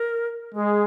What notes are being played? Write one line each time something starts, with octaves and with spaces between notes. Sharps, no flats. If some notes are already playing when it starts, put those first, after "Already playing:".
Already playing: A#4
G#3 G#4